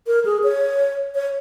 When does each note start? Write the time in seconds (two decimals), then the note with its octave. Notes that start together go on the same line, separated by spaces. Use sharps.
0.07 A#4
0.25 G#4
0.43 C#5
1.15 C#5